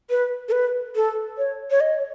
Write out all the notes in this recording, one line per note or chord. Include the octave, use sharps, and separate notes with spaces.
B4
A4
B4
A4
C#5
C#5
D#5